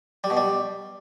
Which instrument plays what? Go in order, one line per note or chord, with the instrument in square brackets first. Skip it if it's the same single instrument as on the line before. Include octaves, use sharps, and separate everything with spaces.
[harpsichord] G3
B2
G3